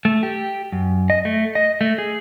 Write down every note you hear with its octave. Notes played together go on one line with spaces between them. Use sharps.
A3
G4
F#2
D#5
A3
D#5
A3
G#4